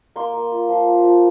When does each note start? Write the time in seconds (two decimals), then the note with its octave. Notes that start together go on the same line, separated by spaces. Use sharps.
0.16 A#3 C6
0.34 A#3
0.51 F4
0.69 F3
0.86 A#3
1.03 F3